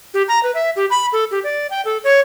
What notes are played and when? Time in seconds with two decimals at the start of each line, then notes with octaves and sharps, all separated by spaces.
0.14 G4
0.28 A#5
0.43 B4
0.55 E5
0.76 G4
0.90 B5
1.13 A4
1.31 G4
1.44 D5
1.70 G5
1.85 A4
2.04 C#5